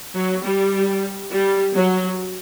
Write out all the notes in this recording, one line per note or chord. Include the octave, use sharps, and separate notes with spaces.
F#3
G3
G3
F#3